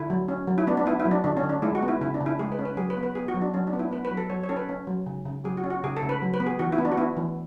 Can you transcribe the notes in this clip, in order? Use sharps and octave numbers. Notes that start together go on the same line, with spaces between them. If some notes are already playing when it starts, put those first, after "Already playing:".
Already playing: D3 E4
F#3
C#4
F#3
E4
B3 D4
D4
B3 E4
E4
F#3
D4
D3 D4
C#4
D3
D4
G#3 E4
F#4
B3
E4
C#3 E4
D4
C#3
E4
G#3 G#4
B4
C#4
B4
F#3 G#4
B4
B3
B4
B3 G#4
F#4
F#3
D4
F#3 C#4
D4
B3
E4
B3 B4
B4
F#3
A4
F#3 C#5
C#5
C#4 A4
B4
C#4
F#3
C#3
C#3
F#3 G#4
F#4
C#4
F#4
C#3 G#4
A4
C#3
B4
F#3
B4
B3
G#4
E3 F#4
E4
B3
D4
F#4
B3 E4
E3